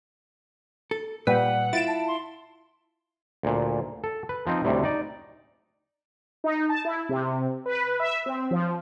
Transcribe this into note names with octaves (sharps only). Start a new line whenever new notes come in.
A4
A#2 G3 B4 F#5
E4 F4 A6 D7 E7
A5
C6
D2 A#2
A4
B4
F3 C4 D#4
D2 A2 C3 G3
D#4 D5
D#4
A5
E4
C3
B4
E5
C4
F3